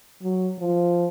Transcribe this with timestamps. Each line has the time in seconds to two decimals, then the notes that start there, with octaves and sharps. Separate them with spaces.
0.22 F#3
0.59 F3